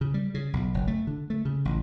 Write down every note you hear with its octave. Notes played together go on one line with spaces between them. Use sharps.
C#3
G3
C#3
B1
F#1
A3
D3
A3
C#3
A1